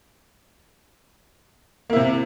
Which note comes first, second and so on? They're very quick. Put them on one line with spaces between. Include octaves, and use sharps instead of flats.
A#3 E4 C3